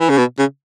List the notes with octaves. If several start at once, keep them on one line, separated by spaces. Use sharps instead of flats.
E3
C#3
B2
C#3